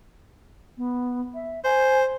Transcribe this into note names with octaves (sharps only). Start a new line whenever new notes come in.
B3
E5
C5 G#5